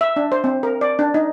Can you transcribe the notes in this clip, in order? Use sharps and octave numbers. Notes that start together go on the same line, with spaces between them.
E5
D4
C5
C4
A#4
D5
D4
D#4